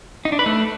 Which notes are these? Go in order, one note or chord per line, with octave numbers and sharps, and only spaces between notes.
D#4
D4
B4
A3